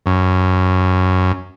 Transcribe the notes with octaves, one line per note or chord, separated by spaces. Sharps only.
F#2